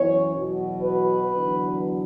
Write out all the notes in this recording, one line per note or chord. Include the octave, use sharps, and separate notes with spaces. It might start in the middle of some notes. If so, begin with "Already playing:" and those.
Already playing: F#2 E3 B3 C#5
E2 B2 F#3
B4
E2 D3 F#3 B3